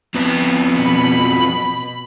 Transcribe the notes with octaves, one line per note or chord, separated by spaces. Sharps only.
F2 B3
B2 B5